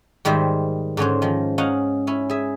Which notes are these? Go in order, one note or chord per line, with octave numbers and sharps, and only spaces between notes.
G#2 D#3 G3 C5 E5
G#2 D3 C#4 C5
D#3 F3
C#4 D#4 F5 F#5
C#4 E4
G#4 E5